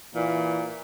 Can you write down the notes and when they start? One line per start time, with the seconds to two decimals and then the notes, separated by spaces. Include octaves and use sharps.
0.15 A#2 E3